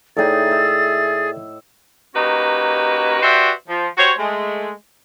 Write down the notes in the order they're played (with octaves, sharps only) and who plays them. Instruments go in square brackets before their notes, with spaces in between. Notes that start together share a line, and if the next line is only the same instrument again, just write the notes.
[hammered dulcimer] A2 D#4 [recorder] G#4 [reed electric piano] A4 D5 G5 [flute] A6
[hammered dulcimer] E5
[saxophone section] A#3 C#4 D#4 F#4 G4 B4
F#4 G4 B4 C5 D5 E5
F3
F#4 G4 C5 C#5
G#3 A3